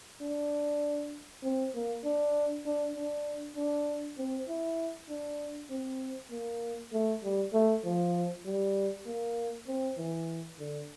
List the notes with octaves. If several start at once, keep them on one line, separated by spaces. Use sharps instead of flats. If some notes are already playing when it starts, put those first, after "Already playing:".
D4
C4
A#3
D4
D4
D4
D4
C4
E4
D4
C4
A#3
A3
G3
A3
F3
G3
A#3
C4
E3
D3